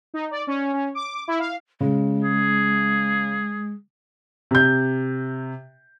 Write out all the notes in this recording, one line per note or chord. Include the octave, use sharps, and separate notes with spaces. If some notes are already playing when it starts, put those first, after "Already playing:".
D#4
D5
C#4
C#4
D6
E4
F5
C#3 G#3
G#4
C3 G6